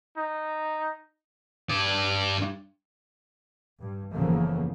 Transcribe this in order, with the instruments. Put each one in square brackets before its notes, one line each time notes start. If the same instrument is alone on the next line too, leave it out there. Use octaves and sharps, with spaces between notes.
[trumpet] D#4
[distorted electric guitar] G2 D5
[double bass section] G2
F#1 E2 C#3 F3 A3 A#3